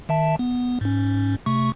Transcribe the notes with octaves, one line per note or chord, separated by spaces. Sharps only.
D#3 E5 A5
B3
G#2 C#4
C3 A3 C#6